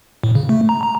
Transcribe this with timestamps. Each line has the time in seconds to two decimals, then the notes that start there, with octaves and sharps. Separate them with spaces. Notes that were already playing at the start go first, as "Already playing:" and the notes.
0.24 A2
0.35 C#3
0.49 A3
0.69 A#5
0.83 A#5